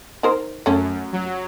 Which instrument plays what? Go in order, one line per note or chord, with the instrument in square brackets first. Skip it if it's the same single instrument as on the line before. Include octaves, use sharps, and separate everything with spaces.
[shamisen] D#4 A#4 C5
[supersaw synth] F#2 [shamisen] A3 C#4
[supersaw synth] F#3